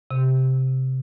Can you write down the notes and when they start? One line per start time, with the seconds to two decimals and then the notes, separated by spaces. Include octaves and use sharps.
0.11 C3